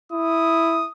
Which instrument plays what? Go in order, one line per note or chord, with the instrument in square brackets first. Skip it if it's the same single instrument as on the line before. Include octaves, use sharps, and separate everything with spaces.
[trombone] E4 [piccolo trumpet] D#6